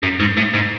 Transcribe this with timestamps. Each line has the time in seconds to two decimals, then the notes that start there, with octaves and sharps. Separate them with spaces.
0.03 F#2
0.20 G#2
0.37 A2
0.53 G#2